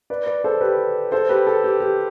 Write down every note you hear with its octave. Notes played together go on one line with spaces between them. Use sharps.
B4 D5
B4 D5
A4 C5
G4 B4
A4 C5
G4 B4
A4
G4
G4